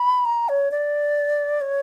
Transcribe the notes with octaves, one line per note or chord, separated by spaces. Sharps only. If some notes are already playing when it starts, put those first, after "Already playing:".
Already playing: B5
A#5
C#5
D5
C#5